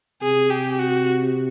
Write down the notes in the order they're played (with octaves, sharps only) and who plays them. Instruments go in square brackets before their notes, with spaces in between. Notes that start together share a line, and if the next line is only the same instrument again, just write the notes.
[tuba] C3 [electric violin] G#4
[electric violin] G4
F#4